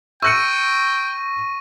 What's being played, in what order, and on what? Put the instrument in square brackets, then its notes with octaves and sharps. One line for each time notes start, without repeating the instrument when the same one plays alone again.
[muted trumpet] G5 [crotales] C#6 A#6 D#7 [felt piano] E6 F#6 C#7